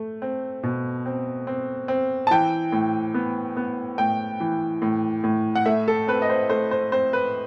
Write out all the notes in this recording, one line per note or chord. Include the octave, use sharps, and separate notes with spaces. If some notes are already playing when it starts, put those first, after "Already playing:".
Already playing: A3
C4
B2
C4
C4
C4
A5
E3 G5
A2
B3
B3
A2 G5
E3
A2
A2
F#5
A3 E5
A4
C4 B4
D#5
C5
A3 C5
C5
C4 C5
B4